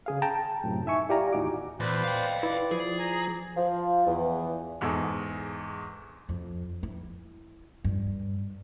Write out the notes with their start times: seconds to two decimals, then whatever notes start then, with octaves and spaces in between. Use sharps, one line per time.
0.06 C#3 G#4 F5
0.22 G5 A5 A#5
0.64 F#2 A2 C3
0.86 D#4 E5 G#5 C#6
1.09 E4 G4 D5 F5 G#5 A#5
1.33 D#2 A2 D#4 F#4 D6
1.80 E2 A#2 B4 C5 D5
2.03 F5 G5
2.43 E4 B4 D5
2.71 F3 G#4
2.99 G#5 A#5
3.57 F3
4.07 E2
4.81 E2 G#2 G#4 A4
6.29 F2
6.83 E4
7.84 G2